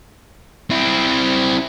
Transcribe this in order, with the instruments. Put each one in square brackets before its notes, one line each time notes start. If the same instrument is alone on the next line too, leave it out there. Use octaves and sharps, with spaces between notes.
[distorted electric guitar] C4 E4